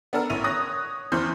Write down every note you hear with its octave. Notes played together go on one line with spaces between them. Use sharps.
B3 D4 A4 A#4
A1 E4 D#7 F7
C#5 D#6 F#6 A#6
E2 E3 C4 C5 F6 G6